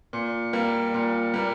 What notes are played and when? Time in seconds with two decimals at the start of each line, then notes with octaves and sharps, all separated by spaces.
0.13 A#2
0.53 G3 A#3
0.94 A#2
1.34 G3 A#3